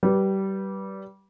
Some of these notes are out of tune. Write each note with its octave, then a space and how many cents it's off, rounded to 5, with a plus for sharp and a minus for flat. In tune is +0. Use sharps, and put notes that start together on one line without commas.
G3 -20 B4 -20